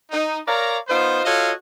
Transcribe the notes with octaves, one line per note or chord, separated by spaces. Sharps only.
D#4
A#4 C#5 D5 F5 A#5
B3 D#4 F4 C5
F4 F#4 A4 C#5 D#5 F5